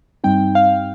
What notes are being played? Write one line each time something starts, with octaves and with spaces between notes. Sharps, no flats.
G2 G3 C4 D#4 G5
F5